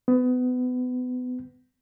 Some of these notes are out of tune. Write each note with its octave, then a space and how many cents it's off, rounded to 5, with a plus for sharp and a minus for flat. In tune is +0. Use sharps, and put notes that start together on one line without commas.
B3 +25